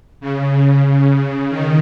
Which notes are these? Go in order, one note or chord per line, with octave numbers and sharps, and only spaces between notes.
C#3
C#3
D#3